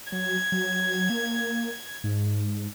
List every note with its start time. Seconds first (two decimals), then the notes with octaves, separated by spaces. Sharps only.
0.12 F#3 G#6
0.52 F#3
1.10 A#3
2.04 G#2